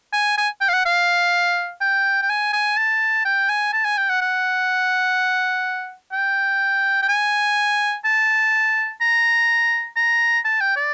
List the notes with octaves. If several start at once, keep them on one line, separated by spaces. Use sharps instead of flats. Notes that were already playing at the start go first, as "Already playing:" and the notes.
G#5
G#5
G5
F5
F#5
F5
G5
G5
G#5
G#5
A5
G5
G#5
A5
G#5
G5
F#5
F#5
G5
G5
G#5
A5
A#5
A#5
A5
G5
D5